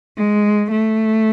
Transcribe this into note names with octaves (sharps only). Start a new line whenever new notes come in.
G#3
A3